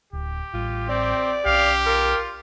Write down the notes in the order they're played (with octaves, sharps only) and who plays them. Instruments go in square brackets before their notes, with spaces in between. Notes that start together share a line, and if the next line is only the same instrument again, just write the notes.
[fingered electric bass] D1 [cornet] G4
[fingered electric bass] A1 G3 [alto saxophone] F4
[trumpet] C4 [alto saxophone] D5
[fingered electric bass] B1 C#4 [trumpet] G4 [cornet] F5
[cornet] F4 [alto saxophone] A#4